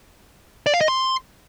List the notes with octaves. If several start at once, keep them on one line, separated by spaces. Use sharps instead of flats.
D5
F5
D#5
C6